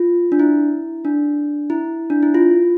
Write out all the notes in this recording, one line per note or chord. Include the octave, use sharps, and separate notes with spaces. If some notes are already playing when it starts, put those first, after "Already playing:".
Already playing: F4
D4
E4
D4
E4
D4
E4
F4